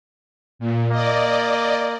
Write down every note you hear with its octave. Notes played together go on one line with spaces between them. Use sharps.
A#2
A#3 D5 D#5